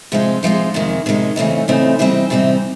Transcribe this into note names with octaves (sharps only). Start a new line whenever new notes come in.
C3 F3 G#3 C4 D#4
C3 F3 G#3 C4 D#4
F2 C3 D#3 G#3
F2 C3 D#3 G#3
C#3 E3 A3 C4 D#4
C#3 E3 A3 C4 D#4
C3 E3 G3 C4 D#4
C3 E3 G3 C4 D#4